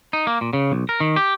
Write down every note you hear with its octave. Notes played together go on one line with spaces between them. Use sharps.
D#4
A#3
A#2
C#3
B1
A#4
D#3
G4